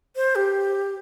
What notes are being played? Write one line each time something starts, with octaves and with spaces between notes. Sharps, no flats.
C5
G4